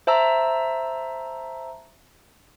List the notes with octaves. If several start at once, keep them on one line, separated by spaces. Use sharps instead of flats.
C5 E5 A5 A#5 E6